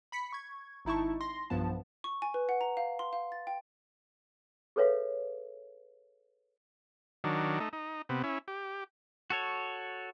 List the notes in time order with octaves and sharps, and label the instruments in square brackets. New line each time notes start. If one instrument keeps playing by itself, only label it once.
[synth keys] B5 B6 C#7
C#6 G#6
G#1 D#4 E4 A5 C#6
C6 A#6
B1 G2 F3 B3 A5
[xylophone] C#6
G#5
B4
F#5
A#5
F5
C6
F5
A6
G5
[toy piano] G#4 A4 B4 C#5 E5 F5
[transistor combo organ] D#3 F#3 D4
A3 D#4
D#4
C3 B3
C#4 E4
G4
[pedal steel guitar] F#4 A4 C#5